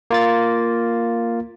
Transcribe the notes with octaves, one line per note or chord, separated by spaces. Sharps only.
A#3 F4 A6